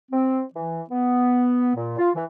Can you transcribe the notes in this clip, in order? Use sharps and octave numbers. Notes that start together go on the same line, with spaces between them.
C4
E3
B3
A#2
F4
E3